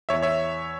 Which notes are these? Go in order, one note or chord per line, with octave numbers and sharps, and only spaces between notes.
E2 C#5 E5
C#5 E5